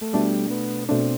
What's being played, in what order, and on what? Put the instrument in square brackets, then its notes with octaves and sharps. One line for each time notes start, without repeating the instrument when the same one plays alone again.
[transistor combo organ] A3
[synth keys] B2 A3 D4 [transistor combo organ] G3
[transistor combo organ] B3
[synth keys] B2 A3 D4 [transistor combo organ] C4